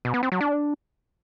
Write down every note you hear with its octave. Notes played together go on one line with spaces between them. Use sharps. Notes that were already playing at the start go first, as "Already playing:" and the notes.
B2
B3
C4
F#3
D4